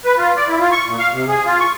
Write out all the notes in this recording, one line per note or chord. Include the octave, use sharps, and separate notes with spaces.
B4
F4
D5
E4
F4
C#6
A#2
F5
C3
G#4
F4
C#6